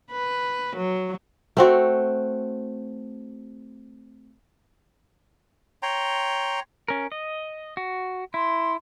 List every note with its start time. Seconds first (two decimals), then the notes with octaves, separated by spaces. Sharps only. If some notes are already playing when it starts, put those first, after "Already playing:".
0.11 B4
0.76 F#3
1.57 A3 C4 F#4
5.83 C#5 G5 A#5 C6
6.88 C#4 A#4
7.12 D#5
7.77 F#4
8.34 E4 C6